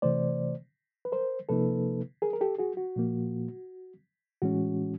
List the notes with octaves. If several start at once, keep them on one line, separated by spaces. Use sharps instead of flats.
C3 E3 A3 C5 D5
B4
A#4 C5
C3 F3 A#3 D#4 A4 B4
G#4 A#4
A#4
G4 A4
F#4 G#4
F#4
A#2 F3 A#3
A2 E3 G#3 C#4 F#4